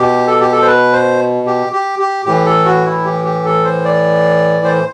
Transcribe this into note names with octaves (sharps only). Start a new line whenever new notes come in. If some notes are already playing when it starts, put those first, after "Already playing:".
Already playing: B2 G4
A4
G4
A4
C5
B4
C5
G4
G4
G4
A2 E3 G4
A4
F#4
E4
G4
G4
A4
C5
D5
C5